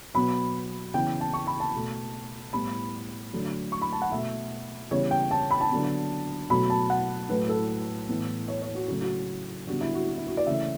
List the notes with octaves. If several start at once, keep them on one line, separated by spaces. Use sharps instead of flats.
B2 F#3 B3 B5
C#3 E3 B3 G5
A5
C#6
B5
A5
B2 A3
A2 G3 B3 B5
D3 F#3 A3
C#6
B5
A5
F#5
B2 A3 E5
C#3 E3 G3 B3 C#5
G5
A5
B5
A5
D3 F#3 B3
B2 F#3 A3 B5
A5
F#5
A2 F#3 A3 B4
A4
A2 E3 B3
C#5
C#5
F#4
C#3 F#3 A3 F#4
F#4
D3 G3 B3 F#4
E4
F#4
F#4
E4
F#4
D5
C#3 E3 A3 E5